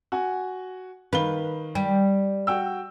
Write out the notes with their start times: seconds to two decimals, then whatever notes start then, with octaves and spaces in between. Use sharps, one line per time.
0.12 F#4 G#5
1.13 D#3 B4 F5 G7
1.75 G3
2.47 F#4 G5 E6